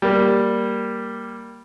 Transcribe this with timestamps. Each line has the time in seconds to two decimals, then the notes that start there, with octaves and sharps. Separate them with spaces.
0.02 G3 A#3